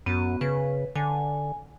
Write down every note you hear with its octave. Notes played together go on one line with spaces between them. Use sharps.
F#2 B3 F#4
C#3 B4
D3 G#5